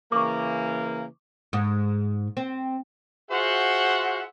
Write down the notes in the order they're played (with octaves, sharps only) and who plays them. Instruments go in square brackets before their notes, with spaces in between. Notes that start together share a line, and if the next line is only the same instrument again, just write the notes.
[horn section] C#3 E3 A#3 [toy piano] C#6 D6
[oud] G#2
C4
[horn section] F4 F#4 G#4 C5 E5 F#5